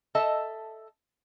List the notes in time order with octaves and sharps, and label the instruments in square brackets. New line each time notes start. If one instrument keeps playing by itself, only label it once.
[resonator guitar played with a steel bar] A4 D#5 E5 A5